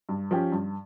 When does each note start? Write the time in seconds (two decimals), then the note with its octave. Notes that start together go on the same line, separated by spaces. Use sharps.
0.09 G2
0.31 F3 C#4 G4
0.52 G2